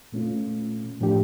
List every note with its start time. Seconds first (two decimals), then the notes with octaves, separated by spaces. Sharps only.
0.12 A#2 A3 C#4 F4
1.00 A2 F3 A3 D4 G4